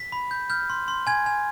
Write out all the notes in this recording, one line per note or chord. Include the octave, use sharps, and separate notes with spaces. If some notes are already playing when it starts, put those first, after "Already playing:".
Already playing: B6
B5
G6
F6 G6
C6
C6
G#5 G#6
G#5